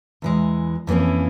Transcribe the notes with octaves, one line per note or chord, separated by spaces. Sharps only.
E2 E3 G#3
F2 E3 A#3 C#4 E4